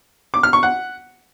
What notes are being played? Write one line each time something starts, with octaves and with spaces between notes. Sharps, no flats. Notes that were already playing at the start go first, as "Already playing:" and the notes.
D6
F6
C#6
F#5